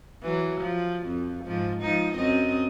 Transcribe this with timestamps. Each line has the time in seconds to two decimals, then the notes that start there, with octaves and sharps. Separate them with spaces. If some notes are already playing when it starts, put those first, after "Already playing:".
0.23 E3 F#3
0.61 F3
1.07 F2
1.46 G#2 F3
1.81 F3 G#3 D#4
2.16 F#2 C4 D#5